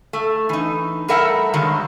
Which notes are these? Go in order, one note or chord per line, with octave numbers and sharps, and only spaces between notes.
A3
E3 D#4
G3 A3 A#4 E5 F#5
G2 D3 D#3 F#3 G#3